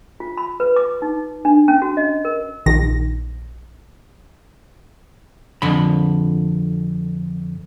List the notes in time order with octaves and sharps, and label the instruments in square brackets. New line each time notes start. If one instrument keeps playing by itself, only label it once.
[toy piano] F4
B5
B4
D6
D#4
D4
C#4
F#4
D#5
A#4
[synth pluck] A#1 D#3 A#6
[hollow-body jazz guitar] F2 D3 B5